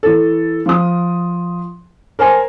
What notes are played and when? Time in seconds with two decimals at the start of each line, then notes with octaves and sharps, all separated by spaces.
0.03 E3 A4
0.66 F3 D#6
2.19 A#4 C5 G#5